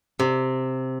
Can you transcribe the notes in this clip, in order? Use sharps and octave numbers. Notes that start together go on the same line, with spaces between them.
C3